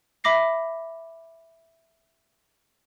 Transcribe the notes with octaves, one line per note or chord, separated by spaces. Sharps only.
E5 B5 D6 A#6 C7